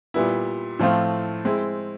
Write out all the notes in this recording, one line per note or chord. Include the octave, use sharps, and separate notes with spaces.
A#2 G3 B3 E4
A2 F3 A3 C4 F4
G#3 C4 E4